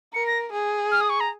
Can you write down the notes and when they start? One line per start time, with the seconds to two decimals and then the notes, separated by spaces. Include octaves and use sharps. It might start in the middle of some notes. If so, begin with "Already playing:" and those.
0.14 A#4 C#7
0.27 A#6
0.52 G#4
0.91 F6
1.01 D#6
1.10 C#6
1.20 A#5